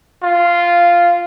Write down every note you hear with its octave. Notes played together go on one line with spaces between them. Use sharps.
F4